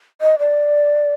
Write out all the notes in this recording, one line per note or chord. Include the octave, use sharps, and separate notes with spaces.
D#5
D5